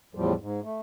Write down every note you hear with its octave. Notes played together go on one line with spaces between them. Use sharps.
E2 A2 F3 G3
G#2
A3